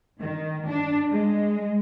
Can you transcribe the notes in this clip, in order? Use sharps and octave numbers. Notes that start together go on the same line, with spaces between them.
D#3
D4
G#3